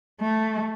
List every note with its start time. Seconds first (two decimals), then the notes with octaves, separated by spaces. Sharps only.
0.21 A3